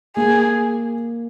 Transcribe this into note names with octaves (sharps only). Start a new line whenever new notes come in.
A#3 G#4